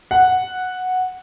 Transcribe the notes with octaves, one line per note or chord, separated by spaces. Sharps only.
F#5